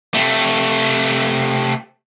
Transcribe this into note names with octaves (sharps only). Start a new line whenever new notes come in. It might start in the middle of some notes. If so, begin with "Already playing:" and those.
C3 A3